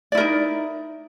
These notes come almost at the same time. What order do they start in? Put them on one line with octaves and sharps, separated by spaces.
D5 E4 A#4 D#4